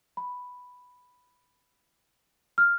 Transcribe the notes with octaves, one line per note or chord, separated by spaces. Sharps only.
B5
F6